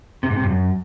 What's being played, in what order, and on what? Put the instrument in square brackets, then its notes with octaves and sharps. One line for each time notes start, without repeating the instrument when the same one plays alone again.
[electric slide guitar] C3
G#2
C3
G2
F#2